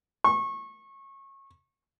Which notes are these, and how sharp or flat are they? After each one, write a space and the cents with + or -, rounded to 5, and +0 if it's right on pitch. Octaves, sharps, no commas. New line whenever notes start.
C#6 -25